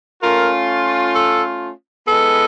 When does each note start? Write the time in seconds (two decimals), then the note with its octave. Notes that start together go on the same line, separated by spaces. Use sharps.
0.22 A3 C#4 F4 A#4
1.15 A4
2.07 E3 G#3 B3 A4